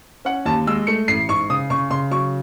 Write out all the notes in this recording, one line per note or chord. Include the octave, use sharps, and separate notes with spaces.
C#4 F#5
D#2 A5
G#3 E6
A3 C#7
A1 C7
G#2 C#6
C#3 D#6
C#3 C#6
C#3 C6
F#3 C#6